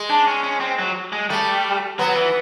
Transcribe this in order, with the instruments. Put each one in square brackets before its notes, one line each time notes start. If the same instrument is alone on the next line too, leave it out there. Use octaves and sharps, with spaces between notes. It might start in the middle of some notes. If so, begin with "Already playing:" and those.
Already playing: [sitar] G#3
[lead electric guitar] D4
C#4
C#4
C4
F#3
G#3
[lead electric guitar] G3 [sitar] A3
[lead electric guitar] F#3 [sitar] B3
[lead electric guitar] E3